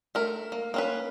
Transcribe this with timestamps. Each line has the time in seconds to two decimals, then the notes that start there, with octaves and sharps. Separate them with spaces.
0.15 A3 A#4
0.52 A#3
0.74 A#3 C#4 B4